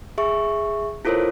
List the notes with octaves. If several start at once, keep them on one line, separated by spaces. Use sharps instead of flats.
G#4 E5 C#6
E4 F4 A4 A#4 C5 C#5